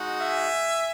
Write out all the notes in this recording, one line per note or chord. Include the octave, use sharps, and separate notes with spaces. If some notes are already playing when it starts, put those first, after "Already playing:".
Already playing: G#3 D#4 F#4
E5 G#5